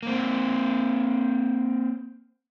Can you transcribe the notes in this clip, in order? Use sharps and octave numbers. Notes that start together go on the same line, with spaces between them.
A#3 C4